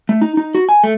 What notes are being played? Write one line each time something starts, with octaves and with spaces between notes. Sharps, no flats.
A3
D#4
D#4
F#4
G#5
A3